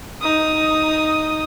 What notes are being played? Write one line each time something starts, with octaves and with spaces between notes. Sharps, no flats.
D#4 D#6